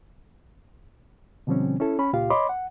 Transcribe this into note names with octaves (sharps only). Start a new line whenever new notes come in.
B2 D3 F3 G3 C4 C#4
C#4 E4 A4
C#4 B5
C#2 A#2 F4 G4 F5
C#5 D#5 B5 C6 D6
F#5